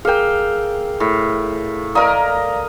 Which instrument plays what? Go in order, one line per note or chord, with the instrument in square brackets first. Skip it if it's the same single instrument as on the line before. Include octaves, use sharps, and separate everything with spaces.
[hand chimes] G#4 A#4 [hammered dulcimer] F5 G5
[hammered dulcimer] A2
[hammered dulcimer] A#4 D#5 [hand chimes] D5 F5 A#5